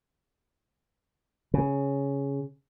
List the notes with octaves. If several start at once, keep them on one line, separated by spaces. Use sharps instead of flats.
C#3